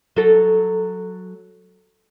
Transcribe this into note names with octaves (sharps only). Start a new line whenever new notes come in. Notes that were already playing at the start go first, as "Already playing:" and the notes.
F#3 A4